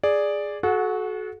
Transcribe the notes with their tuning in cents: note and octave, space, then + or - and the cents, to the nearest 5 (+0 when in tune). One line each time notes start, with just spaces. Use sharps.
G#4 +0 D5 +0
F#4 +0 A4 -40 F#5 -20